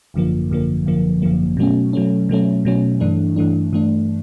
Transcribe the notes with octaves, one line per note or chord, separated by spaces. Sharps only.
G#1 F#2 D3 F3 A#3
G#1 F#2 D3 F3 A#3
G#1 F#2 D3 F3 A#3
G#1 F#2 D3 F3 A#3
B2 F#3 A3 C#4
B2 F#3 A3 C#4
B2 F#3 A3 C#4
B2 F#3 A3 C#4
G2 E3 A3 D4
G2 E3 A3 D4
G2 E3 A3 D4